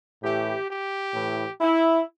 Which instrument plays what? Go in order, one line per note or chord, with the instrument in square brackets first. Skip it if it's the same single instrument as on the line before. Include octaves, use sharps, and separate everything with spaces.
[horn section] A2 E3 G4
G4
A2 E3
E4